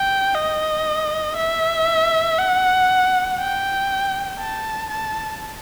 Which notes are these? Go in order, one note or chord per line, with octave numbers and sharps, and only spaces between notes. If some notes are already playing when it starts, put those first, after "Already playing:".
Already playing: G5
D#5
E5
F#5
G5
A5
A5